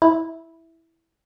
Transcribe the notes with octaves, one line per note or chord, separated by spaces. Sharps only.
E4